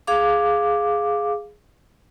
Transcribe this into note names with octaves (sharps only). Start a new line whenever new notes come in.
G#4 F5 D6